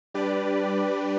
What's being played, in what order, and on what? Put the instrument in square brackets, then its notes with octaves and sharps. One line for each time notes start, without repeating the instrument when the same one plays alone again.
[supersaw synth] G3 D4 G4 B4 D5